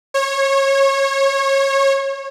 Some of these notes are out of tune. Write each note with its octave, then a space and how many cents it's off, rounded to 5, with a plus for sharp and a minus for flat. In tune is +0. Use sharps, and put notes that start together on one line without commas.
C#5 -25